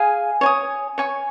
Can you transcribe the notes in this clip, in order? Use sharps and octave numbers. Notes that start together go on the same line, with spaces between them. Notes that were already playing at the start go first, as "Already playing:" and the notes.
Already playing: G#4 F5 G#5
C#5 G#5 D#6
C#5 G#5 C#6